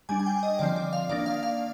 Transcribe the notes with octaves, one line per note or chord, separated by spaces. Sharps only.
G3 D4 G#5
G#5
G5
D#5
D3 F3 C4 D5
D5
F5
D#3 A#3 D4 D5
F5
F5